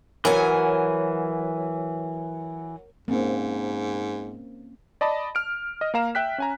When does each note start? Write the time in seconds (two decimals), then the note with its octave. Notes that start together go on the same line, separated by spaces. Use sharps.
0.25 E3 F#3 A#4 G#5
3.08 G#2 A#3 C4 C#4
5.01 D5 D#5 A5 B5
5.35 F6 D7
5.81 D#5
5.94 A#3 A#4 F5 A#5 E7
6.15 E5 G5 F#6 B6
6.38 C#4 G#5 A#5